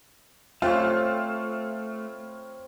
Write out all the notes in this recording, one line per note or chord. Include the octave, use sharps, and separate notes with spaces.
A3 C4 F4 B4 C#5